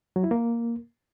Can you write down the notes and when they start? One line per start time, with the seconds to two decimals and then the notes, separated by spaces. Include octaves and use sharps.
0.16 F#3
0.23 E4
0.31 A#3